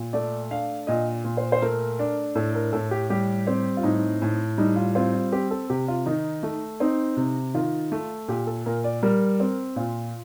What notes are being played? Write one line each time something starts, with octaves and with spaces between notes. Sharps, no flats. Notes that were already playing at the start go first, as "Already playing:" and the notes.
Already playing: A#2
A3 D5
D4 F5
A#2 D#5
A#2
C5
C5
A3 A#4
D4
A2 A4
A#4
A2 A4
G4
G3 G4
C4
F4
A2 D#4
A2
G3 D#4
F4
C4 F4
F4
C4 G4
A4
C3 G4
F4
D#3 D#4
A3
C4 D#4
C3
D#3 F4
A3
A#2 G4
A4
A#2 A#4
D5
G3 A#4
C4
A#2 F4